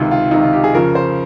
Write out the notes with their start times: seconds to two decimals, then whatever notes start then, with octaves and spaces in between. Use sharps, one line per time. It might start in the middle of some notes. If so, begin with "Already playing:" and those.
Already playing: C#2 C3 D#3 F4
0.11 F4
0.31 C#2 C3 D#3 D#4
0.42 F4
0.53 G4
0.64 G#4
0.74 F2 C#3 F3 A#4
0.95 C5